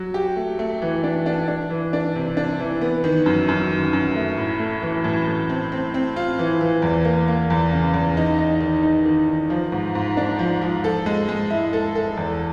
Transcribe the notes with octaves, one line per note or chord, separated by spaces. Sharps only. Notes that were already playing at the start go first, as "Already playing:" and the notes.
Already playing: F#3
G4
A3
A3
E3
D4
D4
D4
E3
D4
C3
D4
E3
B3
D#3
F#2
F#2
D#3
F#2
A3
A2
A3
E3
A2
A2
C4
C4
C4
F4
E3
E3
E2
A#3
A#3
E2
C#3
E2
D#4
D#4
D#3
D#4
D#3
D#3
F3
G#2
G#2
D4
F3
F3
A4
G#3
G#3
E4
A4
A4
E2